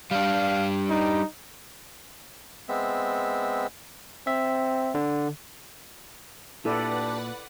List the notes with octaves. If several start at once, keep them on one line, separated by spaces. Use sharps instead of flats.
G3 D4 F5
D#4
G#3 B3 C4 E5
C4 E5
D3
A#2 D4 E4 G4 A4 B4 D5 F#5